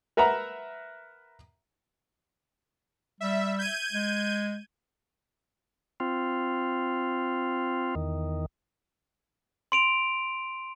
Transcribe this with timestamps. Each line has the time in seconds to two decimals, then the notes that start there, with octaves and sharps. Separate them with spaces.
0.17 A#4 B4 E5 F#5 A#5
3.21 G3 E5
3.59 G6 G#6 D#7
3.93 G#3
6.00 C4 F4
7.95 E2 D#3
9.72 C6 D7 F7